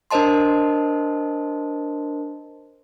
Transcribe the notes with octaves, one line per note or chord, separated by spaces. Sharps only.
D4 A#4 C5 D#5 A5 C6